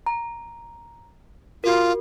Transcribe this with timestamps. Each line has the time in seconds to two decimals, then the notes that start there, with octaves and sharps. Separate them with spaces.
0.06 A#5
1.64 F4 F#4 A#4